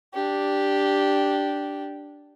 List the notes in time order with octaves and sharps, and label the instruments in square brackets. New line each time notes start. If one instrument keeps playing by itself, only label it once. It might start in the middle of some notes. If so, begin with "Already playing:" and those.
[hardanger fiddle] D4 G4